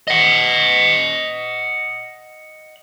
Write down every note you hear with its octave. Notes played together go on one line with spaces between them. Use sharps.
D#5 F#5